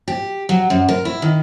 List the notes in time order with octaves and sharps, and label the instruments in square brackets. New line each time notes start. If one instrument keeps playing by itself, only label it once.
[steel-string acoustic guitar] G4
F#3
F#2
A#4
E4
D#3